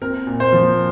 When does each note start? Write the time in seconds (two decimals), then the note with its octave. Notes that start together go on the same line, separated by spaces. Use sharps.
0.02 C4 A#4
0.27 A#2
0.40 C5
0.53 F3